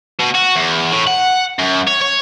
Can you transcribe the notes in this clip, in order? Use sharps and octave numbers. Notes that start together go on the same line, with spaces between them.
B2
F#4
E2
A2
F#5
F#2
C#5
C#5